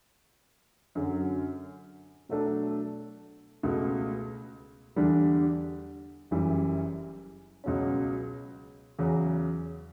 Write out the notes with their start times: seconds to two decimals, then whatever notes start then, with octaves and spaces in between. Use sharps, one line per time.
0.95 F#2 D3 F#3
2.29 B2 F#3 A3 D4 A4
3.63 C#2 B2 A3
4.96 E2 D3 G3 D4
6.31 F#1 F#2 E3 G3
7.64 C#2 B2 F#3 C#4
8.99 E2 C#3 F#3